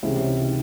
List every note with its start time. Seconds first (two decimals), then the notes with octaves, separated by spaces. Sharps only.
0.03 C#2 C3 E3 G#3 C#4
0.46 D#3